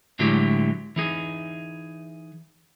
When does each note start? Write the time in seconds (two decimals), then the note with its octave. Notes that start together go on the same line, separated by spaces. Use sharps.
0.19 A2 D3 F#3 G#3 E4 G4
0.96 E3 D#4 G#4